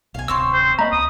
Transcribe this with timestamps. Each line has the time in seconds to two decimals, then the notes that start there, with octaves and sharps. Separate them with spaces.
0.14 B1 B2 F5 G#5
0.28 D1 G#1 C3 C4 C#4 C6 E6
0.53 C5
0.79 A3 A#3 D#5 A#5 B5
0.92 C#2 D#6